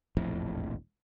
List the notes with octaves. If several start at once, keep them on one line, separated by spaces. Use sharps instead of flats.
E1 A#1 F2 A2